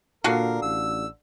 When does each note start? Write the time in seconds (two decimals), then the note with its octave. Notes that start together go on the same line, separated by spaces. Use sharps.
0.24 A#2 D3 F#4 A#4 F5
0.63 A1 E6